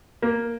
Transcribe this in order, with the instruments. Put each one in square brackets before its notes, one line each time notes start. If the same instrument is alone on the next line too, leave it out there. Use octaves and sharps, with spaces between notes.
[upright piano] A#3